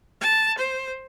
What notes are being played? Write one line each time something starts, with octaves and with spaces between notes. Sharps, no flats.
A5
C5